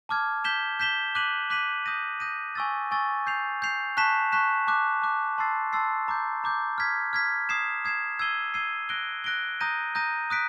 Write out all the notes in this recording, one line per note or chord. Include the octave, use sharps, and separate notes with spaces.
A5 D6 F6 G#6
G6 B6 E7 G7
G6 B6 E7 G7
D6 F#6 B6 D#7 F#7
D6 F#6 B6 D#7 F#7
D#6 G6 A#6 D#7
D#6 G6 A#6 D#7
G#5 C#6 E6 A6
G#5 C#6 E6 A6
G6 C7 F7
G6 C7 F7
A5 C#6 F#6 B6 E7
A5 C#6 F#6 B6 E7
A5 D6 F#6
A5 D6 F#6
A5 C6 E6 A6 C7
A5 C6 E6 A6 C7
A#5 D6 G6
A#5 D6 G6
F6 G#6 B6
F6 G#6 B6
D#6 G#6 C7 E7
D#6 G#6 C7 E7
E6 G#6 C7 D#7 G7
E6 G#6 C7 D#7 G7
F#6 A#6 D7 G7
F#6 A#6 D7 G7
A#5 D#6 G6 A#6 D#7
A#5 D#6 G6 A#6 D#7
D#6 F#6 B6 D7